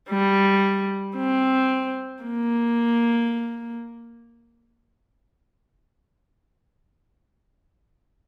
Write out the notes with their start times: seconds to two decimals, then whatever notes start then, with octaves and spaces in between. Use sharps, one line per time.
0.10 G3
1.17 C4
2.23 A#3